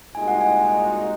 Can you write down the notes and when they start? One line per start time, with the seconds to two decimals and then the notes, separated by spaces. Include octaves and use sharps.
0.14 C2 A#2 G#3 D#4 F#4 G#5
0.28 F#5
0.41 G#5